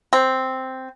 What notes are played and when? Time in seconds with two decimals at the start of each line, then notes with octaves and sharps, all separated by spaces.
0.13 C4